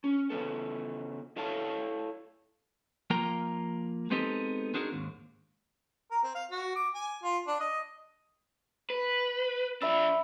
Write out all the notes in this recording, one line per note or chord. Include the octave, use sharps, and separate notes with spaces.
C#4
C#3 G3 B3 A4
E4 A4 C#5 F5 A5
F3 A#3 F4 A#4 G5 A#5
G#3 B3 C4 D#4 G4 A4
C4 D4 D#4 F#4 G#4 A#4
D#2 G#2
A#4
C4
F5
F#4
D6
G#5
F4
D4
D#5
B4
F3 D4 E5 B5 E6